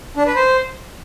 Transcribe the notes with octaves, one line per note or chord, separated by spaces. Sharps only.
D4
B4
C5